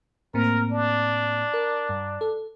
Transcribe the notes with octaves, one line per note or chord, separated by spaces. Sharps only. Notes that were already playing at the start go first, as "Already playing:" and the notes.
A2 A#3 C4 A#4
D4
A#4
G2
A4